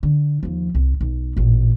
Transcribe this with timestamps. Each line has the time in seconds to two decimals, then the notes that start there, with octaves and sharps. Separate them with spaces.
0.03 D3
0.43 D#2 F3
0.75 C2
1.01 B1
1.37 A1 A#2